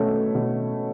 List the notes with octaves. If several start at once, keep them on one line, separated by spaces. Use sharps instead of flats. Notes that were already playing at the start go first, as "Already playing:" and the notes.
Already playing: B2 A3 C#4
B2